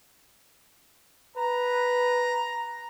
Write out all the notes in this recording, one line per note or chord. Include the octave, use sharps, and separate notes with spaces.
B4 A#5